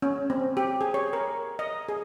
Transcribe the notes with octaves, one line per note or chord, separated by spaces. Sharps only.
C#4
C4
G4
G#4
C#5
A#4
D#5
G#4